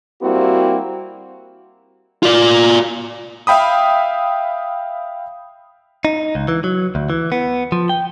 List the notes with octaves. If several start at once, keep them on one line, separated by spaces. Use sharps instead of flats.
G3 A#3 C4 E4 F#4 G4
F4 D5
E5 F5 G5 B5 D#6
D#4
C#2
E3
F#3
D2
E3
B3
F3
G5